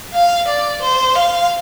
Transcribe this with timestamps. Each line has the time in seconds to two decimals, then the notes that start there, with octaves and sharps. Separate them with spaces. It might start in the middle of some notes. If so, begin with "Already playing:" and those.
0.14 F5
0.48 D5
0.82 C5
1.15 F5